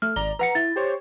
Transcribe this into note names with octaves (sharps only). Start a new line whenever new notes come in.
A3 F6
G#1 D5 A#5 G7
B4 F#5 A#5 C#7
E4 A6
G4 C5 C#5